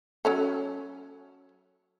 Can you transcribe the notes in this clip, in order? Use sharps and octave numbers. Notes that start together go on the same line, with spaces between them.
F#3 C#4 A4